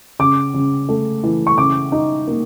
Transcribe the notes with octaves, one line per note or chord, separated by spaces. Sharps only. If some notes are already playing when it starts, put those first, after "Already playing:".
C#3 D6
C#3
A3
E3
C#6
C#3 D6
D#4
A#3